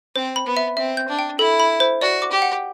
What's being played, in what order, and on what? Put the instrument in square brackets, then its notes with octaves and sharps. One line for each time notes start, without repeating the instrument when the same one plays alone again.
[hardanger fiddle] C4 [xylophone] C5
[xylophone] B5
[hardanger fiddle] B3
[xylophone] E5
[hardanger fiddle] C4 [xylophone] E5
[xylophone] G6
[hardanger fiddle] D4
[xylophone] G5
[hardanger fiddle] E4 [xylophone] A4
[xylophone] B5
C5
[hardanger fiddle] F#4 [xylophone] D5
[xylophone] D6
[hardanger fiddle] G4
[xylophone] F#5